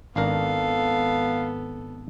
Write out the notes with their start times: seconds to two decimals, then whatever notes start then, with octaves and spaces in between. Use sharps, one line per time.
0.16 G#1 B3 D4 A4 A#4 F5